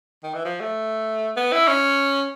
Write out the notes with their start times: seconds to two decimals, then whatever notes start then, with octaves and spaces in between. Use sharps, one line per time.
0.23 D#3
0.34 E3
0.45 F3
0.60 A3
1.36 B3
1.53 E4
1.68 C#4